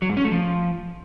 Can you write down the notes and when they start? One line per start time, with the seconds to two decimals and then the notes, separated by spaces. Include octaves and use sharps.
0.02 F#3
0.09 G#2
0.17 C#4
0.24 A3
0.32 F3